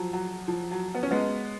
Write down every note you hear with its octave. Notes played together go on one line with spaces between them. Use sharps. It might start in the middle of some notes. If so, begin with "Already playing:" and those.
Already playing: F3 F#3
F#3
F3
F#3
B3
C#4
G#3 B3